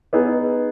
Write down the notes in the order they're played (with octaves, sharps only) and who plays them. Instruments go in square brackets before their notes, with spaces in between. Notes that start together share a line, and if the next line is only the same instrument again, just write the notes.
[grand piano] B3 D#4 G#4